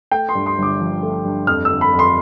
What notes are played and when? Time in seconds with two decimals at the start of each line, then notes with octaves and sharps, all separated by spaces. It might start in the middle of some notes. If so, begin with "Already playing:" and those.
0.11 A3 G5
0.29 C6
0.35 G2
0.46 C6
0.58 G1 D6
0.79 F3
1.03 A3
1.25 G2
1.47 F2 F6
1.65 D3 E6
1.81 B5
1.92 F2
1.99 C6